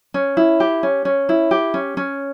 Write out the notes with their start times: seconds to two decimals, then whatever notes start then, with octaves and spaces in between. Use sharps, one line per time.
0.14 C#4
0.37 E4
0.60 G4
0.83 C#4
1.05 C#4
1.29 E4
1.51 G4
1.74 C#4
1.97 C#4